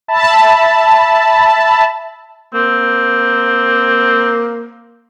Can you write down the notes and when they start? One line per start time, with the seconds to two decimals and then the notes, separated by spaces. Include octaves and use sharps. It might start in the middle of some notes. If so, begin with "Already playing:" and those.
0.08 E5 A5 B5
2.54 A#3 C4